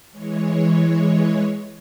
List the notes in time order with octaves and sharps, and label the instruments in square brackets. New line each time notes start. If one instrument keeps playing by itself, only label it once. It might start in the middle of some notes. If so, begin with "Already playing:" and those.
[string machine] E3 G#3 C#5